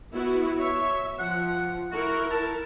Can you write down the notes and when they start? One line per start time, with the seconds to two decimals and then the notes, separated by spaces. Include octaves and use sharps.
0.12 B3 E4 F#4
0.58 C#5 E5
1.19 F3 F#5
1.92 E4 F#4 A#4
2.31 A5